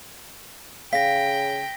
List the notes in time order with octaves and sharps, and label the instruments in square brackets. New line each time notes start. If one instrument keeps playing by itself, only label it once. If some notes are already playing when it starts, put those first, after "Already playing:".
[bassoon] C#3 [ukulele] F5 [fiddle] G5 [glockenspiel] A#6 B6